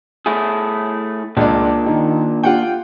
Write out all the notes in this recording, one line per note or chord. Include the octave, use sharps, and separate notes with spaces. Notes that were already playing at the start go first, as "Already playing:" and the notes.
A3 E4 G#4
C#2 A#2 D4 D5
D#3
F4 F#5 G5